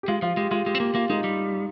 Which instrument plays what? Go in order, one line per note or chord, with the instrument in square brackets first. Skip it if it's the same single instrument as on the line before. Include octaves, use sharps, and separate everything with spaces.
[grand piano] G4
[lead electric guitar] G#3 [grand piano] F4
[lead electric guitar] F3 [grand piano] F4
[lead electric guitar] G#3 [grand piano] G4
[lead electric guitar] G#3 [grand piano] F4
[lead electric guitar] G#3 [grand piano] G4
[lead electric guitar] C4
[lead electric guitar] A#3 [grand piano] G4
[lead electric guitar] A#3 [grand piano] F4
[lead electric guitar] G#3 [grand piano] D#4
[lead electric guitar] G3